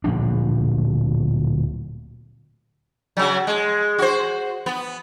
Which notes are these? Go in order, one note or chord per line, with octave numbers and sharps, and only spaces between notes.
D1 A#2 F3 D4
C#3 F#3
G#3
F#4 C5
B3